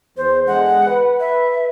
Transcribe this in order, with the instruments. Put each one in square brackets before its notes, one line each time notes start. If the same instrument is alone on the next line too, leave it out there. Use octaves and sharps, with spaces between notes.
[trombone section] E2 [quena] C5
[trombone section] E2 D3 G#3 [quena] F#5
[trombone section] B4
[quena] E5